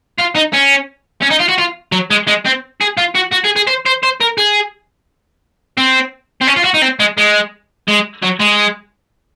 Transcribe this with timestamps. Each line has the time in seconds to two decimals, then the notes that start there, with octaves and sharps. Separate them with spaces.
0.18 F4
0.35 D#4
0.53 C#4
1.22 C#4
1.31 D#4
1.40 F4
1.49 F#4
1.58 F4
1.92 F#3
2.10 G#3
2.27 G#3
2.45 C4
2.81 G#4
2.97 F4
3.15 F#4
3.32 F#4
3.45 G#4
3.56 G#4
3.67 C5
3.86 C5
4.03 C5
4.20 A#4
4.38 G#4
5.78 C4
6.41 C4
6.47 C#4
6.56 F4
6.64 F#4
6.74 D#4
6.82 C4
6.99 G#3
7.17 G#3
7.88 G#3
8.22 F#3
8.40 G#3